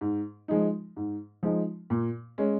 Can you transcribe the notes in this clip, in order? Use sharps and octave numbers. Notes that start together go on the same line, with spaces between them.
G#2
F3 G#3 D#4
G#2
F3 G#3 D#4
A#2
G#3 C#4